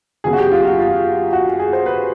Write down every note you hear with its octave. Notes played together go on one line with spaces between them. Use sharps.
F#2 C#3 F#3 B3 G#4
F#4
G4
F4
F#4
F4
F#4
G#4
C5
B4